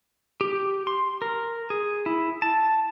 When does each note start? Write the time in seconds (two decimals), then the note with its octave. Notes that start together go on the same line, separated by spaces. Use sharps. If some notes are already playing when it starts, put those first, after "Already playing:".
0.41 G4
0.87 C6
1.22 A#4
1.70 G#4
2.06 E4
2.42 A5